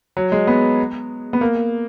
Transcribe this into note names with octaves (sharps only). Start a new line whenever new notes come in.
F#3
G#3
B3
B3
A#3